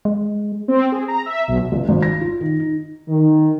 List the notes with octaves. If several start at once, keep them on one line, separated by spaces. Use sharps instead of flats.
G#3
C4
G#4
A#5
E5
B1
C#2
G#1
A#6
F4
D#3
D#4
D#3